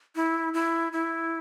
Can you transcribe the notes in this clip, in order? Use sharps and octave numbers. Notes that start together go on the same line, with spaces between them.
E4
E4
E4